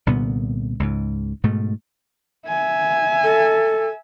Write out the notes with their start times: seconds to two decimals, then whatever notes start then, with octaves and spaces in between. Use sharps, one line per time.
0.07 C2 A#2 D3 B3
0.80 C#2 G#2
1.44 G#2 B2 A3
2.48 E5 G#5
3.24 A4